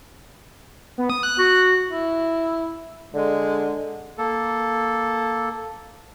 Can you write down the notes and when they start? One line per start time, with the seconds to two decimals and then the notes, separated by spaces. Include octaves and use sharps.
0.98 B3
1.10 D#6
1.23 F#6
1.39 F#4
1.88 E4
3.14 D3 G#3
4.18 A#3 A4